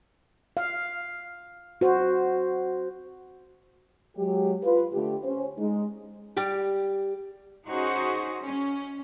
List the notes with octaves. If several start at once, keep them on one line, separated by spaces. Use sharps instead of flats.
F5
F#4 C5
F#3 G#3 G4
F4 B4
D3 A3 F4 G4
C#4 C5
G#3 D#4
G3 G4
C#4 D#4 F#4 G#4 C5
C#4